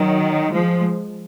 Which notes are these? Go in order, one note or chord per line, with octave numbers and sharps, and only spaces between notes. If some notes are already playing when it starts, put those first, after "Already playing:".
Already playing: D#3 F#3
F3 G#3